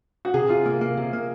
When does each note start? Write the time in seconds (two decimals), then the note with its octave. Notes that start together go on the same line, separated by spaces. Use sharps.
0.25 F#4
0.34 C3 G#4
0.49 C3 F4
0.66 A#3
0.81 A#3
0.97 C3
1.13 A#3